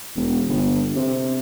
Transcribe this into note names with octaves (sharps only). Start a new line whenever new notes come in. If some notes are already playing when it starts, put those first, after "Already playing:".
E1
G1
C3